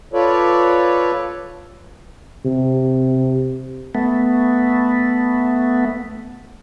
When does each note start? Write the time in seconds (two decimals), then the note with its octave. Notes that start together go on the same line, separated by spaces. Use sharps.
0.13 F4 A4 B4 C#5 D5
2.45 C3
3.95 A3 B3